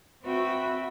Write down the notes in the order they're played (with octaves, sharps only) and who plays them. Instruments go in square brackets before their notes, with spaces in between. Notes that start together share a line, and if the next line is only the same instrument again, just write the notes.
[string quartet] C4 F#4 B4 E5 G5